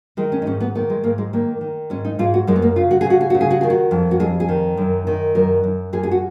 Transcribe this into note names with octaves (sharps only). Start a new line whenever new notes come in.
D#3 G#3
C#4
D#4
G#2 C#4
B3
D#3 B3
G#3
G#2 A#3
G#3
D#3 A#3
D#3
G#2 C#4
D#4
G#2 F4
F#4
F#2 G#3
B3
A#3
C#3 F4
F#4
C#3 G#4
F#4
G#4
C#3 F#4
G#4
F#4
D#3 G#4
F#4
F2
F#4
F2 G#4
G#4
D#3
F#2
D#3
F#2 A#4
F#2
F#2 G#4
G#4
F#4